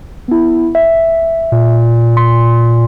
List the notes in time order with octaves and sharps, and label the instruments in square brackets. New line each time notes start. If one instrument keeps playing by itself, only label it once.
[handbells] B3 E4
E5
[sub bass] A#2
[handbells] C6